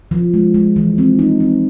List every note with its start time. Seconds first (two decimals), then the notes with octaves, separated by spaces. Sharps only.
0.11 F3
0.34 G#3
0.54 G#3
0.76 E3
0.98 C4
1.19 D#4
1.40 C4